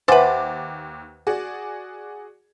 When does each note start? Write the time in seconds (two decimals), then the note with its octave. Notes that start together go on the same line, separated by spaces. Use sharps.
0.08 D#2 B4 C5 E5 F#5 G#5 D6 A6
1.27 F#4 G#4 D5